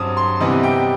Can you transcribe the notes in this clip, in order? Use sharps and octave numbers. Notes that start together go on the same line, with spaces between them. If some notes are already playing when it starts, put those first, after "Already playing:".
Already playing: G2 F#3 C4 D#6
C6
C3 E3 G3 B3 D#5
G5